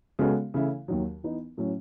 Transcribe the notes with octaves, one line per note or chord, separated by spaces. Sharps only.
C#3 G#3 B3 F#4 A4
C#3 E3 A3 E4
D#2 D#3 F#3
E3 B3 D#4
A2 F#3 C#4